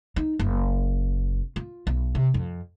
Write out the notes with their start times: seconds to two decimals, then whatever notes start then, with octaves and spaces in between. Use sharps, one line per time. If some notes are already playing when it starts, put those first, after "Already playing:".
0.16 D#4
0.39 F#1
1.56 F4
1.87 B1
2.15 C3
2.34 F2